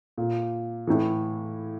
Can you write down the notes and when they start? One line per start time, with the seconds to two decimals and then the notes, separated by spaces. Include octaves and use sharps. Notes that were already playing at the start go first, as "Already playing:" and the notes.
0.18 A#2
0.87 A2 E3